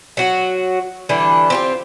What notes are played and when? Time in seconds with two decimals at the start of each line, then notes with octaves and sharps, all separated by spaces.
0.17 F#3 F#4
1.09 D3 E3 G3 D4
1.50 C4 F4 G4